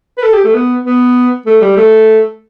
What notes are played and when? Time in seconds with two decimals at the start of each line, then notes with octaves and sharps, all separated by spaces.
0.18 B4
0.23 A4
0.33 G4
0.44 A3
0.54 B3
0.85 B3
1.46 A3
1.62 G3
1.77 A3